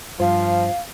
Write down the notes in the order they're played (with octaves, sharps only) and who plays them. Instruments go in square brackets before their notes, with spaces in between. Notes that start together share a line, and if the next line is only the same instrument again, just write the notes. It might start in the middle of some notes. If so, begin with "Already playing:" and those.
[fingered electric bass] G2 [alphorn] F3 [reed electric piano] F4 C5 [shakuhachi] F5